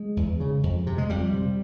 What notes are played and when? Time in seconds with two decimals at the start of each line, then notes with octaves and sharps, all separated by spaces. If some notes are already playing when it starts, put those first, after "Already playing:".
Already playing: G#3
0.17 E2
0.40 C#3
0.63 F2
0.87 C3
0.98 G#3
1.10 F2 G3
1.34 C3